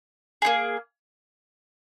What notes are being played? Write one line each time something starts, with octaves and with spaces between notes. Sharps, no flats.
A#3 D#4 G#4